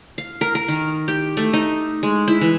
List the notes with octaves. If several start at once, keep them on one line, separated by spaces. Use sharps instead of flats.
F5
A#4
A#4
D#3
G4
A3
D#4
G#3
E4
E3